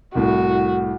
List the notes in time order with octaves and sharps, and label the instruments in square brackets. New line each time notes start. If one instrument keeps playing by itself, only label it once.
[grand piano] C2 A2 [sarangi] F#4